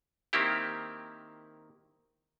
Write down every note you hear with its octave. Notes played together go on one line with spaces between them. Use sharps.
D#3 A#3 C4 E4 G4